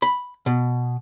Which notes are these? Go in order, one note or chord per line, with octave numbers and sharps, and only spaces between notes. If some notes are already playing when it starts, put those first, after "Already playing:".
B5
B2